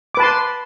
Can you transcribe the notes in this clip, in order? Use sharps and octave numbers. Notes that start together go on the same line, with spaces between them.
B4 A5 C6 D6